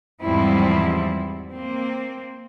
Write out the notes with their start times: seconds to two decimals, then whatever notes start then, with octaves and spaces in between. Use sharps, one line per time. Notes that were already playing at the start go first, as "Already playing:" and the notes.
0.22 E2 G#2 F3 G3 C4 E4
1.51 A#3 C4